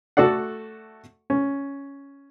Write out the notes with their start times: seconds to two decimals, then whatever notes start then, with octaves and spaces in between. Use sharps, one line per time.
0.17 A3 F#4 A4 D5 F#5
1.30 C#4